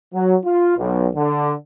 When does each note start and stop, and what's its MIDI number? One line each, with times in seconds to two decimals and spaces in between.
0.14 0.35 54
0.45 0.77 65
0.78 1.08 35
1.16 1.53 50